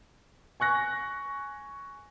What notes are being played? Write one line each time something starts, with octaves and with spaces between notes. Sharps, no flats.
G#5 C#6 F#6 A#6